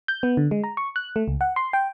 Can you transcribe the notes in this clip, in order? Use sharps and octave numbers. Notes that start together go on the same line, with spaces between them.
G6
B3
D3
G#3
A#5
C#6
F#6
A3
C#2
F#5
C6
G5